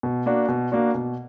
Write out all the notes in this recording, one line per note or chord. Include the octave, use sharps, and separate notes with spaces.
B2
A#3 D4 F#4
B2
A#3 D4 F#4
B2